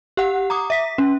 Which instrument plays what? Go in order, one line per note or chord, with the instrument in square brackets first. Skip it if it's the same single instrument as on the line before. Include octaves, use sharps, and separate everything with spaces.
[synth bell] G4 F#5
A#5 D6 D#6
E5 B6
C#4